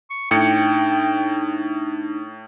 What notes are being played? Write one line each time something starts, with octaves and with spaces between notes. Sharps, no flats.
C#6
A2 D4 D#4 G5 C#7